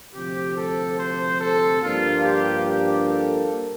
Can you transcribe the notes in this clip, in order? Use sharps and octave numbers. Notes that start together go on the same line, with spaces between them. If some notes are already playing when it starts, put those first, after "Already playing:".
D2 C3 F3 C4 G4
A4
C5
A4
G2 F3 A#3 D4 F4
G4
G4
A4